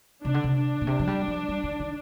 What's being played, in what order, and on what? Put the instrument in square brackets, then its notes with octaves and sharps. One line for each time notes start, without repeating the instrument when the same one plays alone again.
[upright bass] C3 [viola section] D4
[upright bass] D3
C3
[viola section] D4
[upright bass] A#2
C3
F3
G3
F3
G3
D#3
D#3